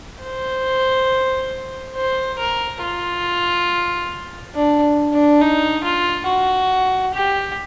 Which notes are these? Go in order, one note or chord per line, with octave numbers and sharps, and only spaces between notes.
C5
C5
A#4
F4
D4
D4
D#4
F4
F#4
G4